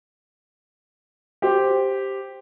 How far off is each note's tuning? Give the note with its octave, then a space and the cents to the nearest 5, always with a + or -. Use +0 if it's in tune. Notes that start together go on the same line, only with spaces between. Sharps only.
G4 +0 C5 +0